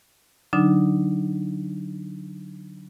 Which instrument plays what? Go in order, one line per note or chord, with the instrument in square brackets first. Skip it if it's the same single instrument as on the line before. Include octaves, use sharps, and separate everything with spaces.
[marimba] D3 F#3 D4 D#4